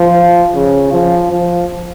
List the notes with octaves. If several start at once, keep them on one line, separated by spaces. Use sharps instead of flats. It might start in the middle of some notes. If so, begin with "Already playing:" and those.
Already playing: F3
C#3
F3
F3